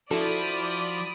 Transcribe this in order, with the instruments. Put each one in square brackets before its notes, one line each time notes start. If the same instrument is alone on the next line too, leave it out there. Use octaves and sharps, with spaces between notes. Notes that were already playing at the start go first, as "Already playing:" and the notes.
[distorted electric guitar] F3 [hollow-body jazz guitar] E4 F#4 A4 [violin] D5 [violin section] B5 D#6